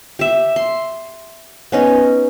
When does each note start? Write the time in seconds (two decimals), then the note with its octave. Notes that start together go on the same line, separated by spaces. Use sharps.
0.19 G4 E5
0.56 C6
1.72 B3 C#4 D#4